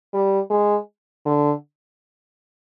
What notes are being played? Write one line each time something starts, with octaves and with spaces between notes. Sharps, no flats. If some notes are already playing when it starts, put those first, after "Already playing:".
G3
G#3
D3